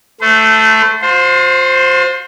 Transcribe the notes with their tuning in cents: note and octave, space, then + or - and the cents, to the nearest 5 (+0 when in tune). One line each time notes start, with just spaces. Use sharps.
A3 +0 C5 -40
F4 +45 C5 +0